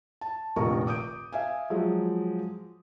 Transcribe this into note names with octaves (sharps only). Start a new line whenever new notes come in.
A5
F1 A#1 D#3 D#4 A#4 C#6
D6 D#6 G6 D7
E5 F5 G#5
F3 F#3 G#3